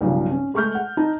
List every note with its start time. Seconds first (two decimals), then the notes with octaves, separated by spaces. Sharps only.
0.01 B1 G2 C#3 F3
0.31 C#4
0.54 G#3 A3 G#4 C#6 F6 G6
0.75 F#5
0.97 D#4 A5